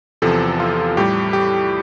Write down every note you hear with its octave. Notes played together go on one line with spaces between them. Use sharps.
E2 C3 F3 A4
F4
A2 G3 G4
G4